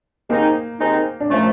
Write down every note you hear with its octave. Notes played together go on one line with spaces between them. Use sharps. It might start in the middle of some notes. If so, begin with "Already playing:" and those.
D#2 D#3 G#3 A#3 C4 D#4
D#2 D#3 G#3 C4 D#4
D4
A#2 F3 A3 C#4